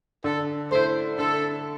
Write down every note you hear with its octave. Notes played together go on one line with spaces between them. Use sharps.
D3 A4
A3 E4 C5
D3 A4